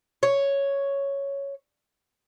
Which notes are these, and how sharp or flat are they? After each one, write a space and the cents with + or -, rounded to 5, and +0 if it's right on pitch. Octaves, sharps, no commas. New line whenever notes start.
C#5 +0